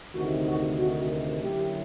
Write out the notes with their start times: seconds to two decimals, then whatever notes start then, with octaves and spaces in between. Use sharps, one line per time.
0.14 D2 C3 D#3 F#4
0.45 F#4
0.77 F#4
1.41 D3 F#3 A#3 C#4 E4 G4